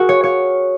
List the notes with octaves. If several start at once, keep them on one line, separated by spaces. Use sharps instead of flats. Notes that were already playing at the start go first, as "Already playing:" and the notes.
Already playing: F#4 G#4 A#4
C#5
C#5